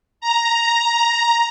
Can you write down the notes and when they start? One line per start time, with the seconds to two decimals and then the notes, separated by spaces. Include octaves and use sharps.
0.21 A#5